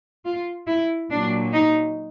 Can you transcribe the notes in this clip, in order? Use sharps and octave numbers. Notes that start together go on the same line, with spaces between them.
F4
E4
A#2 F#3 D4
D#4